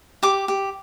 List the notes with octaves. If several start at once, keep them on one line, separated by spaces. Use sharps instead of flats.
G4 D6
G4